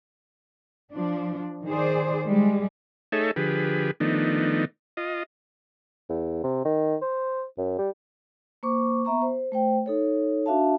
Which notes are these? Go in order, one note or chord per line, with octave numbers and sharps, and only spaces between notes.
F3 D4
D#3 G#4 C5 D5
G3 G#3
A3 D#4 G#4 A4 C#5 E5
D3 F3 G4 G#4 B4
D#3 F3 A3 B3 D4 D#4
F4 D#5
E2
C3
D#3
C5
F#2
G3
A#3 C5 C#6 D6
B3 E5 A#5 C#6
C5
A3 C5 G5
D#4 A4 C#5
D4 F#4 E5 F5 A5